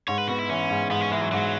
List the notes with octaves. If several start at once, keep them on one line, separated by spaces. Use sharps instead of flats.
G#2 C#5
B4
B3 F#4
E4
E3 C#4
G#2
G#2 B3
C#4
E3 G#3
F#3
G#2 F#3